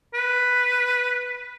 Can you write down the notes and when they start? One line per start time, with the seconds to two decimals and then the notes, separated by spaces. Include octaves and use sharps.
0.14 B4